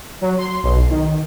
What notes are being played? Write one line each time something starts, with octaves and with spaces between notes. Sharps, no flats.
F#3
C6
B1
D#3